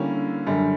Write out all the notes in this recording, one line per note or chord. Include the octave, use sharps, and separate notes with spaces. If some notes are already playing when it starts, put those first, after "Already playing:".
Already playing: D3 G3 A#3 C#4 E4
F#2 D3 G3